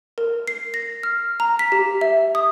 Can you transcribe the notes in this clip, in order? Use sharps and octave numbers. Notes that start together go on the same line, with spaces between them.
A#4
C7
A#6
F6
A#5
B6
G4
E5
D#6